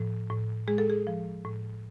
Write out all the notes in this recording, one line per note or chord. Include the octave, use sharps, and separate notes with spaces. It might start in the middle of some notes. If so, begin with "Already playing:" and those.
Already playing: A2 F3
A2
G#3 G#4
A4
G#4
F3
A2